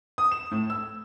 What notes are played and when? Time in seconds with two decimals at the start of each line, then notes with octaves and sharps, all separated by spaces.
0.18 D#6
0.31 E7
0.51 A2
0.70 E6